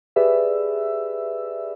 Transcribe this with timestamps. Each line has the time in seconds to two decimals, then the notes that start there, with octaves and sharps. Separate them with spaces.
0.16 G4 G#4 B4 D5 E5 E6